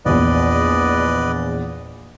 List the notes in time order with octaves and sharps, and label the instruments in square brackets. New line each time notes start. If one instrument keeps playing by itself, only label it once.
[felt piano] A#1 E2 [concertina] B4 D5 D#5